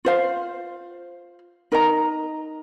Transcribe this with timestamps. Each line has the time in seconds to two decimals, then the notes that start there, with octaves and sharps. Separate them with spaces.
0.05 F4 C5 F5
1.72 D#4 A#4 D#5 A#5